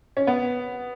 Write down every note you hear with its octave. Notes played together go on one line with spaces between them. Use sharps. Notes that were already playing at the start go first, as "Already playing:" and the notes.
C#4
B3